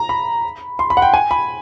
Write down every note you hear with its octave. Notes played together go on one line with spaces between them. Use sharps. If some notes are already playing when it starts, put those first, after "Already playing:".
Already playing: A#5
B5
C6
B5
F#5
G5
G#5
B5